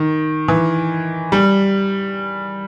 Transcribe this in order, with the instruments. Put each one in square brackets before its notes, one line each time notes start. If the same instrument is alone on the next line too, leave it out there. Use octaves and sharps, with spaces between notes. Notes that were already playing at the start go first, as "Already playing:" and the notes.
Already playing: [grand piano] D#3
E3
G3